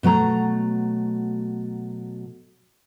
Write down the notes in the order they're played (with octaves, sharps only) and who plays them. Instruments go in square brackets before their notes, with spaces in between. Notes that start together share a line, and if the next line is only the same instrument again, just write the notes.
[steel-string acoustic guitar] B2 F#3 A3 A#5